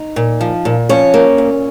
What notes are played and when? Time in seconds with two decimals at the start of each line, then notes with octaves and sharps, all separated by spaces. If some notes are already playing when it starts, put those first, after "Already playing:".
Already playing: D#4
0.16 A#2
0.41 F3
0.65 A#2
0.89 F3 C#4 C#5
1.14 A#3
1.38 A#2